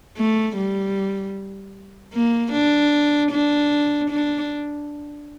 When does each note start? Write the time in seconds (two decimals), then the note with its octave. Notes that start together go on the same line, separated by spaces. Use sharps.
0.17 A3
0.56 G3
2.13 A#3
2.52 D4
3.31 D4
4.10 D4